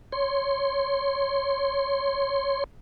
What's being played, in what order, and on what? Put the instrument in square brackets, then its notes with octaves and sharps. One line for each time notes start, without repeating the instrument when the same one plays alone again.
[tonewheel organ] C#5 C6